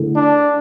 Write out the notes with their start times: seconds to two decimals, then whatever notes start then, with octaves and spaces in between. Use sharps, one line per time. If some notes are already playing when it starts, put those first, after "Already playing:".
Already playing: D3 A3 E4 G#4
0.16 D4